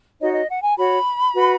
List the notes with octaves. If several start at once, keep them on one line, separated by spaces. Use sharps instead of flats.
D#4 F#4 C#5 D#5
D#5
F#5
G#5
F#4 C#5 B5
F#4 B4